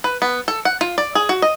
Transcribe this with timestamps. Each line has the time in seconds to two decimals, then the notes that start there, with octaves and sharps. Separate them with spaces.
0.04 B4
0.22 B3
0.48 A4
0.65 F#5
0.81 F4
0.98 D5
1.15 G#4
1.29 F#4
1.42 D#5